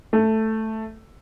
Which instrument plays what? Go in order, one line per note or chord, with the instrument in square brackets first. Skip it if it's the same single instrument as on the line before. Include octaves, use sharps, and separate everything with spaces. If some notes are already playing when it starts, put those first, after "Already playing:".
[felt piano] A3